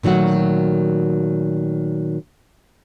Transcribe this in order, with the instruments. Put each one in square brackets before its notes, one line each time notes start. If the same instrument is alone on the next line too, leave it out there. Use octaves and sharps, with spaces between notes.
[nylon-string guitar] A#2 D#3 F#3 A3 F#4